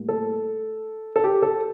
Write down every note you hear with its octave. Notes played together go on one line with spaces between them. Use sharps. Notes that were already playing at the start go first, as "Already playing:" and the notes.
Already playing: A2 G3 A#3
A4
A4
G4
A4